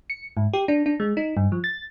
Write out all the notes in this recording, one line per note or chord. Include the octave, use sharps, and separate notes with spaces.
C#7
G#2
G4
D4
D4
G#3
D#4
G2
F3
A6